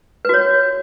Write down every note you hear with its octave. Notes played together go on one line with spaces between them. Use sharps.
F#4 B4 C#5